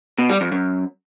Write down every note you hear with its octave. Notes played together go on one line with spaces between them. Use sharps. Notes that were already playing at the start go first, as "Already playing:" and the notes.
B2
G3
F2
F#2